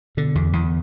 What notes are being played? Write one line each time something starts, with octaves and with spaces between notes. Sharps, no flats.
B2 D3
E2
E2